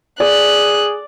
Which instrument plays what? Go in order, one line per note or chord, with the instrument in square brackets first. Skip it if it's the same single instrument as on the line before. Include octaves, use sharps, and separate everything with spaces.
[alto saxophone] G#4 [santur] D5 [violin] F#6